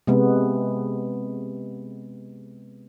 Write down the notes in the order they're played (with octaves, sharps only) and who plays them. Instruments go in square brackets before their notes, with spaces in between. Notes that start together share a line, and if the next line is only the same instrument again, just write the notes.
[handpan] C3 G#3 B3